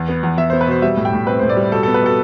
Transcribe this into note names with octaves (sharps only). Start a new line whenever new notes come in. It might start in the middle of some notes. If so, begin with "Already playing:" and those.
Already playing: E2
B3
E2
E2 E5
B3 C5
B4
B2 C5
G3 E5
A2
G5
A2
C4 B4
A2 C5
D5
G3
B2 A4
B3 A4
B4
B2 A4